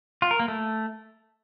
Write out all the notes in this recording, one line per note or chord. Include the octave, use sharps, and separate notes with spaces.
F4
A#4
A#3
A3